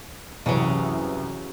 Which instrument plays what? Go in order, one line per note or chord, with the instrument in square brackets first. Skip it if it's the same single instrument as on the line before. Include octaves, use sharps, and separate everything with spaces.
[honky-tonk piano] C2 F#2 E3 [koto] C#3 F#3